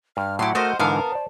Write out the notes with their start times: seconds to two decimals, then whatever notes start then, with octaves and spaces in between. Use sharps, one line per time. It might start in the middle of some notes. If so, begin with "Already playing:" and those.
0.17 G2 F6
0.39 A2 F#3 E4 G4 F#5 C6
0.55 A3 F#4 A#4 C5 D#5 F5
0.79 G#2 D3 E3 B3 A#4 F5 A5
1.12 C5 D5